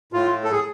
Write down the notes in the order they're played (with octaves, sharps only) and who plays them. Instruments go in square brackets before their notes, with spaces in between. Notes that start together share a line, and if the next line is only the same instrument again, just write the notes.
[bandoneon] A2 F4
A4
G#4